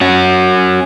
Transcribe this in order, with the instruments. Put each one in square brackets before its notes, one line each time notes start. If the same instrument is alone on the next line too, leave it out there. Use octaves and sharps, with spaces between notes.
[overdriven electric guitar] C#4 F#4